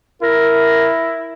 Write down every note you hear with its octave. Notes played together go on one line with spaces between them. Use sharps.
E4 A#4